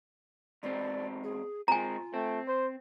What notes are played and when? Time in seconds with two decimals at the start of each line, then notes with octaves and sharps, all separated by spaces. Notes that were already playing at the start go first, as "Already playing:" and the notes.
0.63 E2 G#2 C4 D5
1.24 G#4
1.68 G#3 C4 F4 G#5 A#5
2.14 A3 C4
2.47 C5